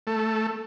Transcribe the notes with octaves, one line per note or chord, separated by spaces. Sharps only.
A3